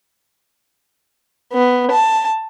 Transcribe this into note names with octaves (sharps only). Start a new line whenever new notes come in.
B3
A5